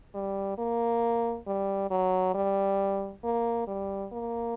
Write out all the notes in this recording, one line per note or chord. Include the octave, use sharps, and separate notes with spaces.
G3
A#3
G3
F#3
G3
A#3
G3
A#3